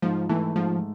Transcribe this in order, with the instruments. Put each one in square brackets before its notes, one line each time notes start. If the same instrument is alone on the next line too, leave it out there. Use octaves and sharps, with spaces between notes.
[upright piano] G#2 [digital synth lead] F3
[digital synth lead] E3 [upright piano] A3
[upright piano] G#2 [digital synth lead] F3